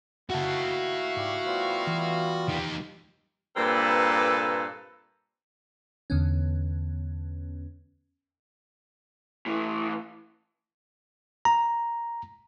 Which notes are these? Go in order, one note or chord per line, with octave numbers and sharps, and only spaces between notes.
D#3 A3 E4 F#4 F5 F#5 A5
G#2 G3 G4
G3 B3 F4 C5
E3
D#3 G4
G2 A#2 A#3 C4 A4 B4
E2 D3 B3 C#4
A2 E3
A#5